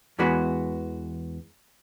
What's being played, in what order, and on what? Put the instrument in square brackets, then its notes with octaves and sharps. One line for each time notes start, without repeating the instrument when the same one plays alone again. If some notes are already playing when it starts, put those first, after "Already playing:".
[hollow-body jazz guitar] E2 E3 G#3 B3 F#4 B5